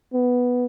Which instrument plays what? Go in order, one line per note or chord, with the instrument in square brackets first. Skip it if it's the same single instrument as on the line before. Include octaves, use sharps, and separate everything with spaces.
[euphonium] B3